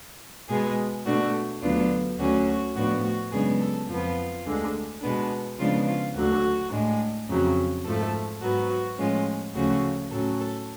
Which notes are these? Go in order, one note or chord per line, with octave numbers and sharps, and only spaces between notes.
B2 G#3 B3 G#4
B2 A3 D4 F#4
D2 D3 F#3 B3 D4 F4
D2 D3 F#3 C#4 F#4
F#4
A2 F3 B3 D4 F#4
F#4
F#2 C#3 G#3 B3 D4 G#4
A4
F2 F3 B3 F4
D2 D3 G#3
B2 G#3 B3 D4
C#3 F3 G#3 B3 D4 F4
F4
D2 D3 F#3 F#4
A2 G#3 D4
F2 C#3 F#3
G#2 F3 A3 A4
G#2 F#3 B3 F#4
F#4
A2 F3 G#3 C#4 F4
D2 C#3 F3 A3 C#4 F#4
A2 F#3 C#4 A4
A4